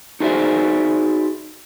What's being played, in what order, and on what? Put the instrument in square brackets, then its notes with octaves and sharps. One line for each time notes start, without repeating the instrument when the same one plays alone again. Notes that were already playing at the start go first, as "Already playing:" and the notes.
[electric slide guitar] D#4 F#4 G#4 C5 D5 E5